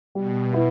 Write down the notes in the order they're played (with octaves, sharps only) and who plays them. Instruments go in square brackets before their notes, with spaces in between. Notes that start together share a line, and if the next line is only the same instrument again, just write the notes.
[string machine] B2 [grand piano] G3
[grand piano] B3 E4